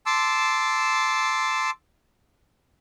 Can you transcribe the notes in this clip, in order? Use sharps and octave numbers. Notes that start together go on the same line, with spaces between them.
A5 C6 D6 E6